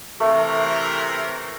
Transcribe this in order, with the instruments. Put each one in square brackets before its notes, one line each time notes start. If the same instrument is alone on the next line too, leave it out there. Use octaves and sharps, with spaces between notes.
[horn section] C3 E3 A#4 [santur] A3